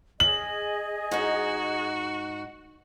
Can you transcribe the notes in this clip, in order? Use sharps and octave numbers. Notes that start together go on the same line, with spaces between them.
G#4 D#5 F#7
G#2 D#4 F#4